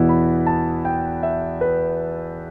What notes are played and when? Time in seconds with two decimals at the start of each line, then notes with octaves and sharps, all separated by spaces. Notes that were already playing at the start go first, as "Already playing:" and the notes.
Already playing: E2 B2 B3 E4
0.09 B5
0.47 A5
0.85 G5
1.23 E5
1.61 B4